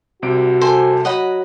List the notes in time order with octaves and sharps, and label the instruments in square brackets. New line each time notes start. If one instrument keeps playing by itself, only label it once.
[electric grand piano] C2 C3 D7 [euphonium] F#4
[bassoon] A4 [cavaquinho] C5 G#5
[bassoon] F#3 [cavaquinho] D#5 F#5 B5